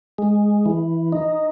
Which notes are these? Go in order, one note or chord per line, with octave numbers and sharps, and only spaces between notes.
G#3
E3
D#4